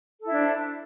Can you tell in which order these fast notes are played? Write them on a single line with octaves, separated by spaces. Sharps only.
A4 E4 D4 C5